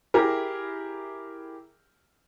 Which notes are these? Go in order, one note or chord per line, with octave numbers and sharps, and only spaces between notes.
E4 G4 G#4 A#4